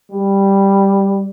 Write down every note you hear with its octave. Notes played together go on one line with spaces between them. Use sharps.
G3